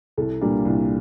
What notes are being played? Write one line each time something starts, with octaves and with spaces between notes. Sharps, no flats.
C2 A4
A#2 G3 A#3 D4
C2